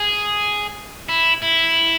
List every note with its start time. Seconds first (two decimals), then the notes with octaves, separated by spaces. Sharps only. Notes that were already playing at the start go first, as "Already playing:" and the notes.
Already playing: G#4
1.09 E4
1.42 E4